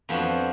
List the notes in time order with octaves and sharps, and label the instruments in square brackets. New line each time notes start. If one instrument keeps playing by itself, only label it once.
[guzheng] F2 F3 B3 D4 F#4